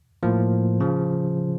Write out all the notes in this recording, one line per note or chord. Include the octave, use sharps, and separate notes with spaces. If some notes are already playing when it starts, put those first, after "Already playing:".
A2 F3 A#3
C#3 F3